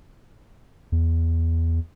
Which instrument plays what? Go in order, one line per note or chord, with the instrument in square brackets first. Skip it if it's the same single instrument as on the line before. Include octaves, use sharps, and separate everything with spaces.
[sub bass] E2